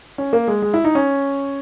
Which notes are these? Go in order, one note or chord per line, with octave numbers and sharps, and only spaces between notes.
C#4
A#3
G#3
G#3
E4
D#4
C#4